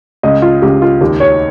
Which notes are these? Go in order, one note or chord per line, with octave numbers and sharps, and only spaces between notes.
C#2 D#5
F4
C#2 G4
F4
D#2 G4
C#5